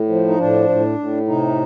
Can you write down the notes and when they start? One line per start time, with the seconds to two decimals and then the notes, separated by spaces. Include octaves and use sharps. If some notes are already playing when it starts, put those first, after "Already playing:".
Already playing: A2
0.09 F3
0.28 D#4
0.39 A2 D4
0.69 A2
0.99 A2
1.28 C3 D#4